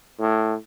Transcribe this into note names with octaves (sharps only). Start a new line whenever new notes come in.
A2